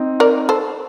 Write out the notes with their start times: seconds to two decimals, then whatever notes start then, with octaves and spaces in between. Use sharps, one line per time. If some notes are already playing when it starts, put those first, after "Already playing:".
Already playing: C4 D#4
0.20 A#4 D5
0.49 A4 C5